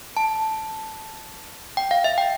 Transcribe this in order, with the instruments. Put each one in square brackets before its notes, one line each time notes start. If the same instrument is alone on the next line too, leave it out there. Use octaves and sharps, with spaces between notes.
[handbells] A5
G5
F5
E5
G5